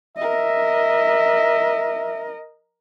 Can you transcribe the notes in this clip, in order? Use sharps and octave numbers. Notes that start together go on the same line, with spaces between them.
A#4 D#5 E5